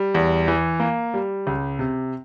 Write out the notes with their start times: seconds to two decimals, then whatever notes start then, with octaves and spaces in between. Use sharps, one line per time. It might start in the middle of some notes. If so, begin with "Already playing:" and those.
Already playing: G3
0.14 E2
0.48 E3
0.80 A#3
1.14 G3
1.47 C#2
1.79 C3